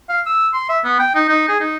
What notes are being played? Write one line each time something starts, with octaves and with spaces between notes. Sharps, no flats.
F5
E6
C6
E5
B3
G5
D#4
D#4
G#4
D#4